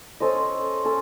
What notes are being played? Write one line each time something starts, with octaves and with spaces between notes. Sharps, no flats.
C#4 A4 C5 D#5
C#4 A4